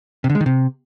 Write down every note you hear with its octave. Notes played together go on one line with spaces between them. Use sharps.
C3
D3
G#3
D#3
C3